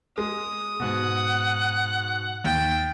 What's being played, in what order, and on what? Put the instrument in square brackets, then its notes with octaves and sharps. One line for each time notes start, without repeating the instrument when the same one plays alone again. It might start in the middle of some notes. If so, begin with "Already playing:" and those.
[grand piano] G#3 [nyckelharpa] D#6
[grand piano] G#2 B2 [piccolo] F#5
[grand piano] D#2 [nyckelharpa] G5 [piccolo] A6